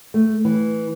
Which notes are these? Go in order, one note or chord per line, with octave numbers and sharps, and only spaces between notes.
A3
E3